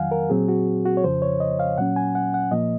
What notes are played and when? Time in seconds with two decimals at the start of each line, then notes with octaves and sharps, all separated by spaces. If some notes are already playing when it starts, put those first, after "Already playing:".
Already playing: F2 D#3 F#3 F5 F#5 G#5
0.11 A#4
0.30 A#2 F#3 C4 G#4
0.48 F#4
0.85 F#4
0.97 C#5
1.04 F2 C#3 F3 C5
1.22 C#5
1.40 D#5
1.60 F5
1.78 A#2 F#3 C#4 F#5
1.96 G#5
2.15 F#5
2.34 F#5
2.51 A#2 F3 A#3 D#5